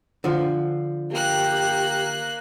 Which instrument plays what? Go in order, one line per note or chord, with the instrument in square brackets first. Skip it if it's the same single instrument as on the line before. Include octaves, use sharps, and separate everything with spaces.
[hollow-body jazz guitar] D3 F3
[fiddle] A#3 F#6 [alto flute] G4